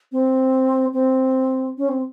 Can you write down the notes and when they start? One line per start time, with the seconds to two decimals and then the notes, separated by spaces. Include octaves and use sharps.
0.12 C4
0.93 C4
1.78 C#4
1.89 C4